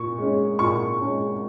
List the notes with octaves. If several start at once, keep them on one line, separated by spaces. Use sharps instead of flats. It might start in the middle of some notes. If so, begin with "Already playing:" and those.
Already playing: A#2 C#6
G#3 C#4
A#2 C#6
G#3 C#4